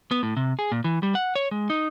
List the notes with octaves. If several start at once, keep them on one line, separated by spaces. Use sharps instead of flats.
B3
A2
C3
G#4
A#2
E3
G3
F#5
C#5
G#3
D#4